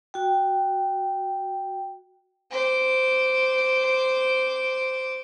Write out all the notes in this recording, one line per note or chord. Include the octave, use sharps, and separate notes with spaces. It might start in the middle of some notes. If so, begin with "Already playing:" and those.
F#4 G5
C5 D6